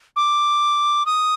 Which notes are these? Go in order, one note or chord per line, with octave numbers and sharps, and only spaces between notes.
D6
D#6